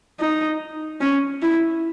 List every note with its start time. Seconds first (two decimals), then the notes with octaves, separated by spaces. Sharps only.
0.20 D#4
1.01 C#4
1.42 E4